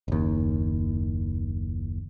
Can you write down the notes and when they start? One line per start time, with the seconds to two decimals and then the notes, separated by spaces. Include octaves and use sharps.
0.08 F#1 D#2